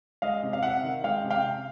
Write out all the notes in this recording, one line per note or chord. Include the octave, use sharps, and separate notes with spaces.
G#3 D#5 F5
C3
F5
C3 E5 F#5
D#3
G#3 F5 G5
C3
F5 G5
C3